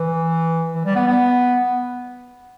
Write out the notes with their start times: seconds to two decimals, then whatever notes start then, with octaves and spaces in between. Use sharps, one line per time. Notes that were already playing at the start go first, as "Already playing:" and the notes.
Already playing: E3
0.75 E3
0.85 G3
0.95 B3
1.07 B3